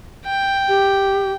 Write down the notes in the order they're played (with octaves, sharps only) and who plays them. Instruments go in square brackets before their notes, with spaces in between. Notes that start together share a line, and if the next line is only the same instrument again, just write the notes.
[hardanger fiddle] G5
[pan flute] G4